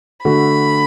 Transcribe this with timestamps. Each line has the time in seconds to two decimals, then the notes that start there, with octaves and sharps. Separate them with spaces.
0.25 D3 A3 F#4 B5